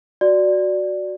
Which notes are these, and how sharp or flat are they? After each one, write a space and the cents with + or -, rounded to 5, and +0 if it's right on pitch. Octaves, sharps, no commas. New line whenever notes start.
F#4 +0 D5 +0